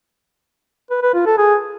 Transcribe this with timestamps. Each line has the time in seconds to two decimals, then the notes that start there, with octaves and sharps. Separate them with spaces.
0.91 B4
1.02 B4
1.14 F4
1.26 A4
1.38 G#4